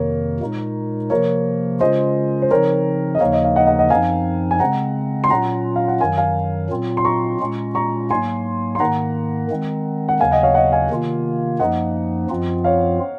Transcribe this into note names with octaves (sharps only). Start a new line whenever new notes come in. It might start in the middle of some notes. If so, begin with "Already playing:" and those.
Already playing: F2 C3 D#3 A#3 A#4 C#5
A#2 G#3 D#4
C3 F3 A#3 A#4 C#5
C#3 G#3 C#4 F4 C5 D#5
C5
C#3 F3 C4 D#4 A#4 C#5
D#5
D#2 C#3 F3 A#3 D#4 C#5 F5
D#5
F5
D#5 F#5
D#5 F#5
D#5 F#5
F#2 F3 C4 D#4 F5 G#5
G#5
C#3 G#3 C4 F#5 A#5
C6
A#2 F#3 C#4 F4 F#5 A#5
F5
F#5
F#2 D#3 F#3 F5 G#5
F5 G#5
A#2 F#3 C4 F4
C6
A#5 C#6
A#2 G#3 C#4 F4
A#5 C#6
G#2 F#3 A#3 G#5 C6
C6
G#2 D#3 A#3 F#5 A#5
D#3 G#3 C4
F#5
D#2 C#3 F#3 F5 G#5
D#5 F#5
C#5 F5
D#5 F#5
F5 G#5
C3 D#3 A#3 F4
F#2 F3 A#3 D#4 D#5 F#5
F#2 F3 C4 F4
C#5 F5